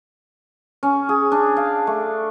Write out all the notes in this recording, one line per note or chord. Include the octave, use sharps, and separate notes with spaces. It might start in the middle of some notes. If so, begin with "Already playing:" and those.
C#4
G#4
D4
F5
A3